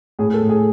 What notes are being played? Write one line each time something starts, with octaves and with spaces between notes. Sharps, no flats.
A2 G#4
A4
A2
G#4